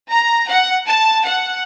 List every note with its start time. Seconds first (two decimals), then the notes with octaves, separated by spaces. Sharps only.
0.12 A#5
0.48 F#5
0.87 A5
1.25 F#5